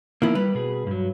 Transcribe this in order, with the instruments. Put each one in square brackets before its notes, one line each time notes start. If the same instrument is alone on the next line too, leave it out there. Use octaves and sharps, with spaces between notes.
[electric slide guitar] D#3 F3 B3 [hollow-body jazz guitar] A#3 E4
[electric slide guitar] G3 [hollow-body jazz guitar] B4
[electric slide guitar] B2 G#4
G2 F#3